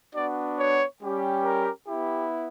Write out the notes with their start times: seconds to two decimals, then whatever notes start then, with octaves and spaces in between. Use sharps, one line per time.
0.13 B3 D4 F#4 D5
0.57 C#5
1.00 G3 C#4 G4
1.44 A#4
1.86 B3 E4 G4